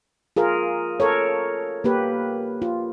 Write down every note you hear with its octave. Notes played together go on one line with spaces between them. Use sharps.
F4 G#4 A#4
A4 A#4 C#5
A#3 G4 B4
F4